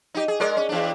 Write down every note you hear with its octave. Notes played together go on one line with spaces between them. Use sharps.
D#4 G4
G#4
G#3 A#4 D5
C#4
E2 D4